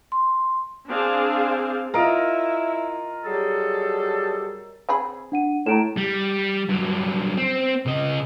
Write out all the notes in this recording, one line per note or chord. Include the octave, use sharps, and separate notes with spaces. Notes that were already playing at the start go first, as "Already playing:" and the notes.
C6
C4 D4 G#4 C5 F5
E4 F4 A#4 D#5 D7
F#3 G3 G#4 A4
C4 G#4 B5
D4 F#5 D#7
A2 A3 A#5 D7 E7
G3
G2 F#3
C4
C#3 D#5